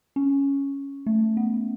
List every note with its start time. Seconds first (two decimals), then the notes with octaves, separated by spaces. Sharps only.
0.16 C#4
1.06 A3
1.37 B3